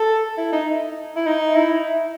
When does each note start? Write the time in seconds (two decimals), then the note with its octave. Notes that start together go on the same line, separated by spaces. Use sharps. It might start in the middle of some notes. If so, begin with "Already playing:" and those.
Already playing: A4
0.37 E4
0.52 D#4
1.16 E4
1.26 D#4
1.56 E4